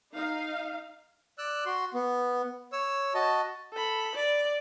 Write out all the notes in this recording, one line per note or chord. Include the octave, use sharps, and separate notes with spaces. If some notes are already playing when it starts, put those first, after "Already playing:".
D#4 F5
D5 E6 F#6
F#4 C6
B3
C#5 E6
F#4 D#5 A5
A4 B5
D5